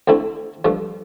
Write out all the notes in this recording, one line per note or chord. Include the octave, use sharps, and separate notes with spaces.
D2 D3 A3 C4 E4
G2 F3 A3